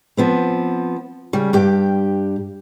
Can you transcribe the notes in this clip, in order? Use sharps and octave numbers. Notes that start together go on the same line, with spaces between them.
F3 B3 C4
C#3 G3
G2 G4 G5